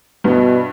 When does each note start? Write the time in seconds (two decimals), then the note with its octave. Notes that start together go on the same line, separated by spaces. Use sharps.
0.24 G2 B2 G3 B3 E4